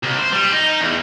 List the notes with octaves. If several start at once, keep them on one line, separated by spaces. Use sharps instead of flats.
C2
C5
G3
D#4
E2